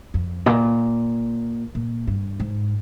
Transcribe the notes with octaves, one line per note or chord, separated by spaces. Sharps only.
F2
A#2
A#2
G2
G#2